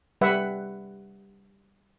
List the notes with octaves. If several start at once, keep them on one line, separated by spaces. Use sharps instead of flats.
G3 B4 E5 F#5